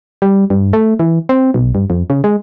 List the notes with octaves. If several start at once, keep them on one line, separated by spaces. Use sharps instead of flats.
G3
G2
A3
E3
C4
B1
G2
F2
C#3
G#3